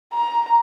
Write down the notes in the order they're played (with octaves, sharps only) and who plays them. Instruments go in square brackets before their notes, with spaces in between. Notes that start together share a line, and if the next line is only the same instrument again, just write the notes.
[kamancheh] A#5